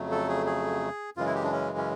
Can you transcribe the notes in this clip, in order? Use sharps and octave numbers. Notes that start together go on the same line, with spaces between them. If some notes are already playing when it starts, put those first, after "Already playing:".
Already playing: F2 C#3 F#3 A3
A4
G#4
G#4
F#2 C#3 E3 G#3 F4
E4
G4
D4
C#4
C#4